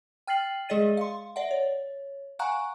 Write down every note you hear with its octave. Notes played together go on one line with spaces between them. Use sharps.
G5 F6 A6 C7 F#7
G#3 G#4 D5 D#5 A6 D#7
F5 C6
D5 E5 F#5
C#5
F5 F#5 G#5 A#5 C#6 F#6